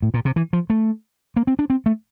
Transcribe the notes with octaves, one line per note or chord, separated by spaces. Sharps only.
A2
A#2
C3
E3
F3
A3
A#3
C4
D4
C4
A3